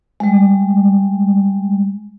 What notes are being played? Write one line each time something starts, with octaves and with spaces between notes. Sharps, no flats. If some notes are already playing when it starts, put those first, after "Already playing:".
G3 G#3